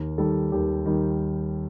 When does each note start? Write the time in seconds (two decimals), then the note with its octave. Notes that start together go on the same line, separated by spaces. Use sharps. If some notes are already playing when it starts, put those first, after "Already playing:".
Already playing: D#2 A#4
0.18 D#3 G3 A4
0.52 D#2 G4
0.86 D#3 G3